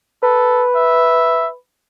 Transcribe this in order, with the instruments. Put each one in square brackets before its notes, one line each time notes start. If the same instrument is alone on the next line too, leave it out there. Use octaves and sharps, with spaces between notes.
[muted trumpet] A4 [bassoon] B4
[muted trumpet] E5